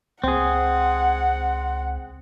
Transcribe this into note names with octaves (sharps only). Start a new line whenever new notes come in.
C#2 C4 G#4 F#5